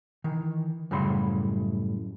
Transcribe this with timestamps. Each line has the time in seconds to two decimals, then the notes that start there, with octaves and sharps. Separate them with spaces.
0.24 D#3 E3
0.91 F#2 A2 C#3 G3 B5 C6